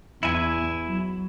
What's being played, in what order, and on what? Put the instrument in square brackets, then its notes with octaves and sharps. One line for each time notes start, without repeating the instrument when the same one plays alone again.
[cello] E2 [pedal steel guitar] E4 G#5
[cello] F#3